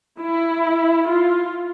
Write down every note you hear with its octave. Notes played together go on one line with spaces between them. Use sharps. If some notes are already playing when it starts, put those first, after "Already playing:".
E4
F4